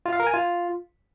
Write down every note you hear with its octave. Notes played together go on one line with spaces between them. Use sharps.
F4
F5
A#4
G#5
F4